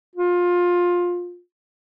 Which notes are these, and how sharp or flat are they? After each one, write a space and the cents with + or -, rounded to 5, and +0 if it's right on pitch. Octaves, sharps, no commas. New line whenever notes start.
F4 +20